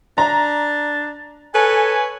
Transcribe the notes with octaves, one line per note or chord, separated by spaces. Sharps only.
D4 A#5
A4 B4 C#5 G#5